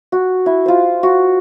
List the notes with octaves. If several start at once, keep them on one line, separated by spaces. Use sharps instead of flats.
F#4
E4
F4 C5
F#4